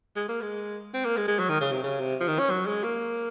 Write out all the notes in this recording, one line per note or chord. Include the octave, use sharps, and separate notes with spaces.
G#3
A#3
G#3
C4
A#3
G#3
G#3
F#3
D#3
C#3
C3
C#3
C3
F3
D#3
C#4
F#3
G#3
A#3